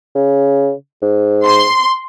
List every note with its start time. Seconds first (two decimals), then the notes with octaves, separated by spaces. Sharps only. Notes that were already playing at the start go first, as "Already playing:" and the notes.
0.15 C#3
1.02 G#2
1.45 C6